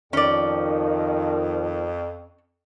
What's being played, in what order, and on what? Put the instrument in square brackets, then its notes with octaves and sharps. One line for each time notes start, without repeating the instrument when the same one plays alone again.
[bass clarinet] F2 [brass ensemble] D#3 F3 [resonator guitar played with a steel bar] C#4 D5